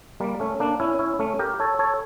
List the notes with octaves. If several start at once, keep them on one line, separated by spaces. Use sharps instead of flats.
G3 A#3
A3 C#4
A#3 D4
C#4 E4
C#4 E4
A3 C#4
G4 A#4
A4 C#5
A4 C#5